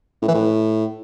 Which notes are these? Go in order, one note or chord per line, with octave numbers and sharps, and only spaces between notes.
A2
E3
A2